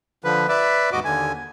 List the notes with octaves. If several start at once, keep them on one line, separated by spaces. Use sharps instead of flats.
D3 F3 B4
B4 D5 E5
D#2 G#2 F#4 D#5 D6
D#2 D3 G#5